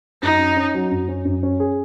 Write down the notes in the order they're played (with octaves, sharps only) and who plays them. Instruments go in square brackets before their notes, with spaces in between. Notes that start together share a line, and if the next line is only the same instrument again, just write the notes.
[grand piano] F#2 [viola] D#4
[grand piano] C#4
C#4
F#3
F#2
C#4
F#2
C#4
G#4